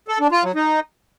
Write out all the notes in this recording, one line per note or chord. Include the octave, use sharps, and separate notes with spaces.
A4
D4
F4
F#3
D#4